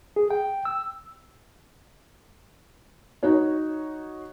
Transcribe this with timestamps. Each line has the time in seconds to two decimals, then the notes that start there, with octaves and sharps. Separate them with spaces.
0.16 G#4
0.31 G5
0.65 E6
3.23 D#4 F#4 C#5